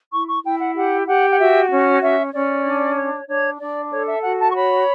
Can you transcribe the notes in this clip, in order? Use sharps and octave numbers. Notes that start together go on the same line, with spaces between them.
E4 C#6
C#6
E4 G5
F#5
G4 F#5
G4 F#5
F#5
F#4 E5
C#4
C#4 E5
C#4 D5
D4
C#5
D4 C#5
D4 D5
A4 C#5
E5
F#4 F#5
A5
C#6
C#5 B5